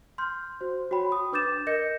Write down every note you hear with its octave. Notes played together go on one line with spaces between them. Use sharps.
C6 F6 G6
F#4 C5
F#4 C#5 G5 B5
D#6
D4 B4 D6 G6 A6 E7
A#4 D#5 G6 A#6 C#7